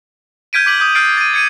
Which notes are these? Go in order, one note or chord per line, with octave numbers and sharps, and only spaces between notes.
F6 G6 G#6 B6 D7 D#7
D6 B6 F#7
D#6 G6
F6 G6 A6 C7 D7
A6 D#7
G#6 C#7 D#7